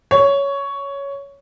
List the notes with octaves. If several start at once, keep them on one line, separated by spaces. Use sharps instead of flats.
C#5